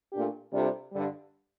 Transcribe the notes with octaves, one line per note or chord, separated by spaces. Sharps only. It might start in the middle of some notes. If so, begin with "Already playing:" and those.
A#2 A3 D4 G4
C3 G3 D4 F4 A4
G2 D3 G3